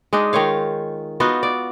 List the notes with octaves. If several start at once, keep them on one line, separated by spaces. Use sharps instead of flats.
G#3 D4 D#4
D#3 F4 C#5 F5
B3 D#4 F4 F#4
D5